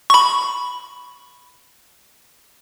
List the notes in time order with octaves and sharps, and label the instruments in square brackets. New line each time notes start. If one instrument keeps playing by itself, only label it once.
[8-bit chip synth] B5 C#6